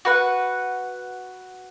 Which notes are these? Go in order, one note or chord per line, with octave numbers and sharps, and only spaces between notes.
F#4 B4 F#5